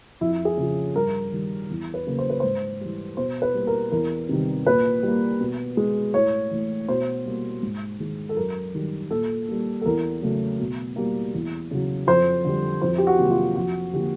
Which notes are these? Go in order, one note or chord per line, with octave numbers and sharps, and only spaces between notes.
F2 E4
G#4
C#3 F3
G2 A#4
D#3 G3
E2
B4
C#3 F#3 A#3
C5
B4
G#2 C5
E3 G3
B2 C5
B4
G3 A#3
A#4
E2 A#4
C3 D#3 G3
A#2 B4
G3 A#3
B2
G#3
A2 C#5
E3 A3
B2 C5
G3 A#3
G#2
D#3 G#3
A4
F#2 A#4
D#3 G3
A#2 A4
G3 A#3
A4
E2 A#4
C#3 F#3 A3
B2
G3 A#3
E2
C#3 F#3
F2 C5
D3 G3
F2 C5
G4
F#4
C3 D#3 F#3 A#3
F4
F2 F#4
D3 F3 A#3 G4